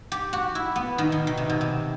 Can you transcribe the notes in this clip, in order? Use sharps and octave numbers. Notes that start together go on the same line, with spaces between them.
G4
F#4
E4
B3
D#3
B2
D#3
C3
B2
C3